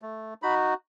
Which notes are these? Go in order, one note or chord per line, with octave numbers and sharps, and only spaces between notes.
A3
D#4 F#4 B5